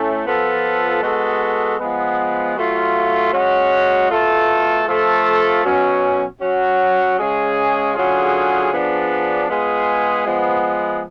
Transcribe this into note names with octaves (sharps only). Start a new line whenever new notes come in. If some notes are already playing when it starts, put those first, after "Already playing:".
Already playing: A2 A3 C#4
F3 B3 F4 A4
G#3 B3 F#4 A4
F3 G#3 B3
F#3 A3 F4
G#3 C#4 F#4
B2 A3 F4 A4
F3 A3 F4 A4
B2 F#3 C#4
F#3 C#4 F#4
C#3 G#3 C#4 G#4
D3 F#3 C#4 F4 G#4
F3 B3 D4 G#4
G#3 B3 F4 G#4
F3 G#3 B3